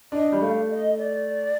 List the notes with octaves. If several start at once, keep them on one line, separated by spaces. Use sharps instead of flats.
D4 D#5
G3
A3 F5
D#5
D5